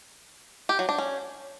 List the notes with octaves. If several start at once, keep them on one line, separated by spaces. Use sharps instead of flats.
G4
F#3
D4
C#4